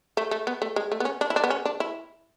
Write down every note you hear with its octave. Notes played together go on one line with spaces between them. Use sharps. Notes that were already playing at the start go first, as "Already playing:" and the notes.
A3
A3
B3
A3
G#3
A3
B3
C#4
D4
E4
D4
B3
C#4
D4
E4